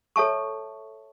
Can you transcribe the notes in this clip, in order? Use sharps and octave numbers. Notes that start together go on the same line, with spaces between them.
A4 C#5 E5 A5 C#6